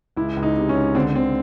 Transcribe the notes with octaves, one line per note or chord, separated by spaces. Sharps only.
C#2 E4
C#2
D#4
C3
C#4
C#2
D3 C4
D3 C4